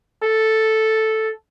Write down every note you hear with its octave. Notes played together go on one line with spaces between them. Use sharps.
A4